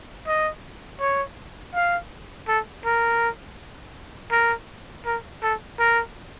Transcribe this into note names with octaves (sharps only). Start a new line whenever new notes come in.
D#5
C#5
F5
A4
A#4
A#4
A#4
A4
A#4